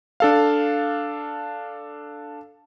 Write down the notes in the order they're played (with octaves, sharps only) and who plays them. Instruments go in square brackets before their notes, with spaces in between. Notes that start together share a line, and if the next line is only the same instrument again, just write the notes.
[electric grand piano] D4 A4 F5